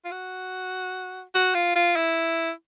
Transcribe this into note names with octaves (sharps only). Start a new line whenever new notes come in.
F4
F#4
F#4
F4
F4
E4